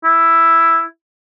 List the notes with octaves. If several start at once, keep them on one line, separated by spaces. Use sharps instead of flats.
E4